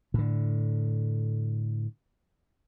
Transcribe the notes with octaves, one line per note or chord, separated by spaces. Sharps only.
A2 D3